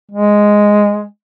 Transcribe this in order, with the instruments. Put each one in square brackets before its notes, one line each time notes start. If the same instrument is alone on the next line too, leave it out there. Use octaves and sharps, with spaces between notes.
[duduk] G#3